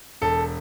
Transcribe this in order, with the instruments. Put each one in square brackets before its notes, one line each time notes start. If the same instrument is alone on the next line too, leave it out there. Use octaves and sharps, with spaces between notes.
[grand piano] E1 A4